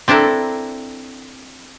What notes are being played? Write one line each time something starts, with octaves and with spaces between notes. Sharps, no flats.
C4 D4 E4 A4 A#4